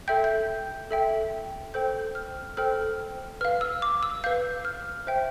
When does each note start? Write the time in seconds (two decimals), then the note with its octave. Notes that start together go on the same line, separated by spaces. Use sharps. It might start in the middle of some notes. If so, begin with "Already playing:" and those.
0.08 A4 E5 G5 G6
0.24 G6
0.91 A4 E5 G5
1.74 A4 C5 G5 G6
2.15 F6
2.57 A4 C5 G5 F6
3.41 B4 F5 F6
3.61 E6
3.82 D6
4.03 E6
4.24 B4 F5 G6
4.65 F6
5.07 C5 E5 G5